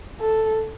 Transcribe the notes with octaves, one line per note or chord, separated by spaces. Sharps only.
A4